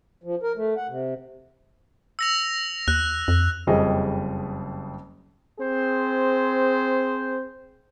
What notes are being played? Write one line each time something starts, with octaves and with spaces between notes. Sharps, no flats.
F3
A#4
A3
F#5
C3
E6 A#6 F7
D#2 F#6
F2
F#1 F2 G3 G#4 D#5
C4 G#4 C5